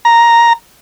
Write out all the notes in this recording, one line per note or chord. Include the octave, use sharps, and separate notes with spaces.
A#5